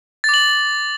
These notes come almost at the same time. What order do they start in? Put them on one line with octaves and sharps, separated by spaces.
A6 D6 F#7